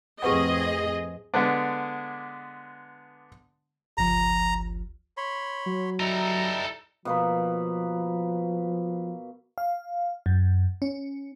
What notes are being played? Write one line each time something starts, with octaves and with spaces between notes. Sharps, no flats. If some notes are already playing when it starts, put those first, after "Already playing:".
F2 A2 C4 G4 G#4 B4 D#5 F#5
D3 G#3 B3 D4
G1 C#2 F3 A#5
C#5 B5 C6
F#3
G3 D#4 E4 A4 A#5
B2 F3 A#3 B4
F5
F#2
C#4